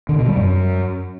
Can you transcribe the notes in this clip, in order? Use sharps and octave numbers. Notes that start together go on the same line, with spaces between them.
D3
B2
G3
F#2